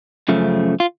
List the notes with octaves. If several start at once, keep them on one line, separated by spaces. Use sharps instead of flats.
F#2 C#3 F3 A3
F4